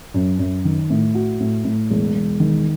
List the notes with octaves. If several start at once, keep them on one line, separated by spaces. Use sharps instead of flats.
F#2
F#2
D#3
A2
F#4
A2
A2
E1
E1
D#3